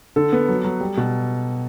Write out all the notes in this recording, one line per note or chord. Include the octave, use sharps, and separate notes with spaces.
D3 A4
B3
F#3
F#3
G3
B2